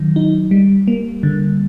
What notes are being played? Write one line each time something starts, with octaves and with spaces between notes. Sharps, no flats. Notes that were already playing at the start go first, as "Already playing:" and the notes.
Already playing: D#3 F#3
D#4
G3
A#3
D3